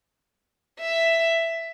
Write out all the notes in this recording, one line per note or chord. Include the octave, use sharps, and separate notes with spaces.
E5